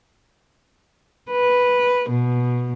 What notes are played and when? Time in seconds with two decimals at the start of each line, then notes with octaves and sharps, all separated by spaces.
1.31 B4
2.10 B2